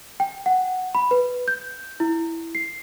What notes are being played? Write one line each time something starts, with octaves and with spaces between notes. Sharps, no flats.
G5
F#5
B5
B4
G6
E4
C7